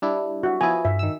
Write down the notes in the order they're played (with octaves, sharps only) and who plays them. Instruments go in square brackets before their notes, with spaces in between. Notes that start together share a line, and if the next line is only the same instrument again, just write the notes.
[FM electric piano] G3 D4 E4
[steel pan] F#4 E5
[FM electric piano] F3 B3 E4 [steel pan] G#5
[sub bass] G2 [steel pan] E5
[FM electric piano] D#3 E6